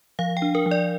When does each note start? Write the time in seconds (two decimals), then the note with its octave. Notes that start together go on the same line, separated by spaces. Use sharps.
0.19 F3 F5
0.37 G5
0.42 D4
0.55 A#4
0.66 F3
0.71 D5